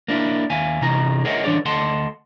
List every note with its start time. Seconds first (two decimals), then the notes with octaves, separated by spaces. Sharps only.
0.08 A#3 D4 E4
0.50 D#2 E5 F5 G#5
0.82 C3 E3 D#4 A#5
1.25 G#4 A#4 C#5 D#5 E5 F#5
1.44 D3 E3 G3 D4 C#5 D5
1.65 D2 A4 D#5 F#5 A5 C6